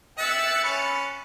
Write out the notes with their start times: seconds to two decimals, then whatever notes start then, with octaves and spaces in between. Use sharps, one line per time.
0.18 E5 G5 F#6 A6 C#7
0.64 C#4 B5